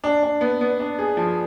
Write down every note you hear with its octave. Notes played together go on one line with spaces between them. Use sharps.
D4
D4
B3
B3
D4
G#4
F3